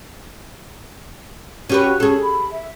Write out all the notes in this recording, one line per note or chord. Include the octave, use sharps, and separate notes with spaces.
C#4 F#4 G4 B4
C#4 G#4 A4
B5
E5